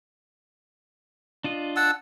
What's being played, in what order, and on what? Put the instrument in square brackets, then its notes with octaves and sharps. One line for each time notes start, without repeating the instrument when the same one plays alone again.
[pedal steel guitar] D4 F4 D#5
[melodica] F#5 A5 E6